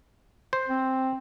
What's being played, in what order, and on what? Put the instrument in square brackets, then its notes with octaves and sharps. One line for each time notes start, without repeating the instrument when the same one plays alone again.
[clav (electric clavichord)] C5
[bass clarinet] C4